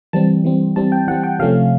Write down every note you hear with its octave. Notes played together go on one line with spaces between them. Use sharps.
E3 G3 C4 A5
E3 G3 C4
E3 G3 C4 A5
G5
E3 G3 C4 F#5
G5
C3 F3 A3 C#4 F5